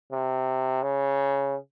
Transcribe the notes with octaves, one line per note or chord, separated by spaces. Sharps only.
C3
C#3